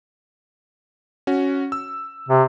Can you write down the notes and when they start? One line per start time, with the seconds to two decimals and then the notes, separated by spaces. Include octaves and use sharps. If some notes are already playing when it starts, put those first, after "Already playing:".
1.27 C#4 F#4
1.72 E6
2.29 C3